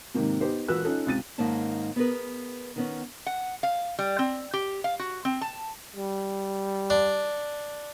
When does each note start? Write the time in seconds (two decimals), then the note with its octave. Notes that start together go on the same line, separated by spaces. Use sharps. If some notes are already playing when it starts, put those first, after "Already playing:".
0.14 G#2 C3 D#3 A#3
0.41 B3 D#4 G4 C5
0.68 E1 A#2 F#4 B4 E6 F#6
0.85 C#4 D#4 F4 A4
1.07 C#2 C3 A6 D#7
1.38 G#2 D#3 A#3 C#4 A5
1.96 B3 G#4 A#4 B4
2.76 D#3 B3 C#4
3.26 F#5
3.63 F5
3.99 G3
4.19 C4
4.53 G4
4.84 F5
4.99 F#4
5.25 C4
5.41 A5
5.96 G3
6.90 D4